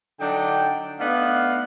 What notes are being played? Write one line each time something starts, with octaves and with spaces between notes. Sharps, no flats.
D3 F#3 D4 D#4 G5
A3 B3 D4 D#4 F5 F#5